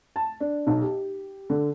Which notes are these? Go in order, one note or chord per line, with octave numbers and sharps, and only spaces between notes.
A5
D4
B1
G4
D3